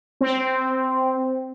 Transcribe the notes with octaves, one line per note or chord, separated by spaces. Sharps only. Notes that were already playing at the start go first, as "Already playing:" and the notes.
C4